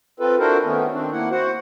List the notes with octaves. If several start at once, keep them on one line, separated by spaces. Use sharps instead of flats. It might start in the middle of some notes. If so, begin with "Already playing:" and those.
C4 F4 A4 B4
D4 E4 F#4 A4 A#4 C5
D#3 A3 B3 C#4
D#3 C4 D4
A#3 E4 F#5
F#4 C5 F#5